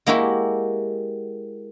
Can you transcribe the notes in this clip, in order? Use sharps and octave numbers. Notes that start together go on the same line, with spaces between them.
G#3 A#3 E4 F#4 G4